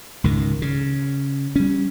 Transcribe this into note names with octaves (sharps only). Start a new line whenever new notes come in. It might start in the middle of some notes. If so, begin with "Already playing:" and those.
C#2 G#2 D#3
C#3
G3 C#4